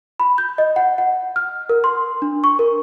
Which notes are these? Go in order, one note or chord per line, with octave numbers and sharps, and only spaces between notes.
B5
G6
D#5
F#5
F#5
F6
A#4
C6
D4
C#6
A#4